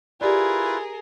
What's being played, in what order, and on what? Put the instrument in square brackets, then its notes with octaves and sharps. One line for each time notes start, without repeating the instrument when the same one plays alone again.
[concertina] E4 F4 B4 [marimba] G4 D5 [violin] G#4 A#4